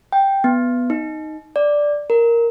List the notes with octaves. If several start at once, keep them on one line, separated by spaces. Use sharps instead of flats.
G5
B3
D#4
D5
A#4